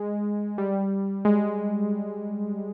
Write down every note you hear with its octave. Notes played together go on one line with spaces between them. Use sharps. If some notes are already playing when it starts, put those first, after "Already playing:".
Already playing: G#3
G3
G#3